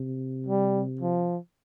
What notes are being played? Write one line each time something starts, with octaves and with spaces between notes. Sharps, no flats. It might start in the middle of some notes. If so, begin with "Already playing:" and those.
Already playing: C3
G3
F3